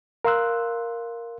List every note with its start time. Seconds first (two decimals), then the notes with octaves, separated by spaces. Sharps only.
0.25 A#4 F5 C6 E6 F#6